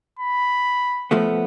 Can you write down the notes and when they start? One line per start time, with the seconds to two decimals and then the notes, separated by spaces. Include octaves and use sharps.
0.19 B5
1.11 F3 A3 B3